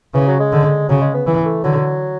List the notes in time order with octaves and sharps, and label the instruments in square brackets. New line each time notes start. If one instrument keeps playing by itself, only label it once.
[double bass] C#3 [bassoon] E3
[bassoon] F#3
G#3
[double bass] D3
[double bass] C#3 [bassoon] F#3
[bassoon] G#3
B3
[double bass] E3 [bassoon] B3
[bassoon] A3
[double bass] D3 [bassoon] F#3